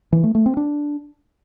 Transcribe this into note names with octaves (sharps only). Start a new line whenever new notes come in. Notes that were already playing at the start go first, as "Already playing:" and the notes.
E3
A3
A3
C4
D4